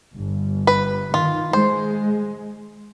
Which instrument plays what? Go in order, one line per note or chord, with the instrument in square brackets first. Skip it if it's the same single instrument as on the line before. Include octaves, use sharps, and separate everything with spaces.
[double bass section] G1
[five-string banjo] B4
[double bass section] D#3 [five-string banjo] F4
[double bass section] G#3 [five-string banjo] C5